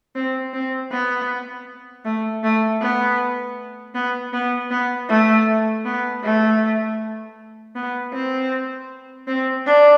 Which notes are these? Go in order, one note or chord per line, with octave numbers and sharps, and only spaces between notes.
C4
C4
B3
A3
A3
B3
B3
B3
B3
A3
B3
A3
B3
C4
C4
D4